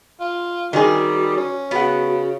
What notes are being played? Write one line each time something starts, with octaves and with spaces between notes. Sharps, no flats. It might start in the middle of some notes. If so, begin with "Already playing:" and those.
F4
D#3 G3 C4 F#4 G#4
C#4
C#3 B3 F#4 F#5